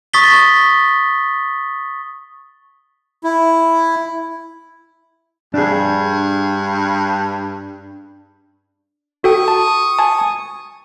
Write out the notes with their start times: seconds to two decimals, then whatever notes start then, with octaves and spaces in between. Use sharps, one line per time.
0.14 C#6 D#6 A6 B6 G7
3.24 E4
5.54 G2 D4 G#4
9.24 F#4 A4 G5 C#6 D#6
9.48 A5
9.99 G#5 A5